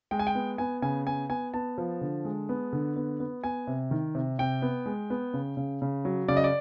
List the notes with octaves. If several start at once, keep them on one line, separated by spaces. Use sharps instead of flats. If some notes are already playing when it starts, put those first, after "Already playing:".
G#3 G5
G#5
G5
B3
B3 G#5
C#3 G#5
B3 G#5
B3 G#5
B3 A5
F3
D3
G#3
B3
D3
B3
B3
B3 G#5
C3
D#3
C3
C3 G5
B3
G#3
B3
C#3
C#3
C#3
F#3
C#3 D5
D#5
D5